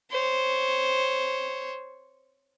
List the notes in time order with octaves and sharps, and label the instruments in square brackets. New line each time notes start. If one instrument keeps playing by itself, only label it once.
[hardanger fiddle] C5 C#5